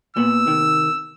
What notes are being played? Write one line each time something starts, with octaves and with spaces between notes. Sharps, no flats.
A#2 B3 E6
C3 D#3